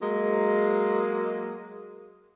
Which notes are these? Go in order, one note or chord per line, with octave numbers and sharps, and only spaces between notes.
F#3 G#3 A#3